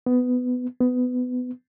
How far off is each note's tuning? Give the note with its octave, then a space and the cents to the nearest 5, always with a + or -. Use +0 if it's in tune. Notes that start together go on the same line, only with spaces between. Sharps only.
B3 +15
B3 +20